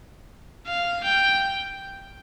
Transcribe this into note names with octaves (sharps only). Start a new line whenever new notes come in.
F5
G5